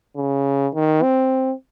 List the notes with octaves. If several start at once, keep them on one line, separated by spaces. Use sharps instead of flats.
C#3
D#3
C4